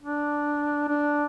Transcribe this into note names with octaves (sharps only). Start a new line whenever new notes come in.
D4
D4